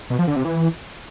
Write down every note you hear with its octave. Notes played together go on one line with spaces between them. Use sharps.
B2
F3
D3
C3
E3